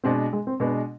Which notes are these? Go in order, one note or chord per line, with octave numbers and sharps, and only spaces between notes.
B2 G#3 C4 D4
G#3
C4
B2 G#3 B3 D4